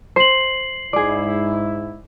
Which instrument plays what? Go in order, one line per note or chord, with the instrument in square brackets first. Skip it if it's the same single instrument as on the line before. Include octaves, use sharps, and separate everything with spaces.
[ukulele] C5 [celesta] C7 F#7
[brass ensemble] G#2 E4 [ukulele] G#4 D5